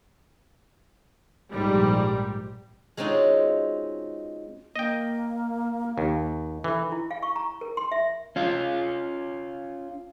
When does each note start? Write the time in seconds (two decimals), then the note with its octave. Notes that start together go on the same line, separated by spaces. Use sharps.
1.51 A#1 G#2 G3
2.97 G#3 C4 C#4 D#4 F4 F#4
4.76 A#3 D#5 G5
5.98 D#2
6.64 E3 A4
6.92 E4
7.11 F5
7.23 C#6
7.36 A#5
7.61 A#4
7.77 C6
7.92 E5
8.36 C#4 F4